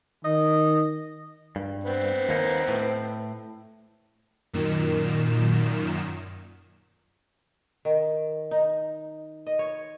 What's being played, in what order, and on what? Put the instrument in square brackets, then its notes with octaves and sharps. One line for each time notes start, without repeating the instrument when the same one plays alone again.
[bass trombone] D#3 [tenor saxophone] D#5
[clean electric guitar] G2
[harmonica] B3 C4
[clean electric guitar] D#2 A#3 D#4
A2
[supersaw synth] F#2 A#2 D#3 E7
[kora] D#3
D#4
D#5
C#5